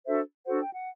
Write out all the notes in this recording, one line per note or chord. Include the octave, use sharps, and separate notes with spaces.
D4 F#4 A4 C5 E5
D4 F#4 A4 C5 F#5
G5
F#5